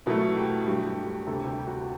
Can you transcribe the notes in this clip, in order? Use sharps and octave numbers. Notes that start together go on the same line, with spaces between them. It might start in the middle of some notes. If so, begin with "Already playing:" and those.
B2 F#3 A3 E4
G4
G2 F#3 A3 G4
G4
G4
D2 C3 G3 A4
G4
F#4